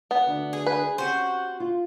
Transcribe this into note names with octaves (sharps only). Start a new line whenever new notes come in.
B3
D2 D4
G#4
B4
C4 C#4 F#4 G4 C5
F4